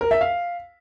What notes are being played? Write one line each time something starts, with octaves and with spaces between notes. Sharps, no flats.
A#4
E5
F5